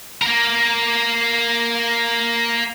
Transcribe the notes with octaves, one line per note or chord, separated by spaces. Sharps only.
A#3 A#4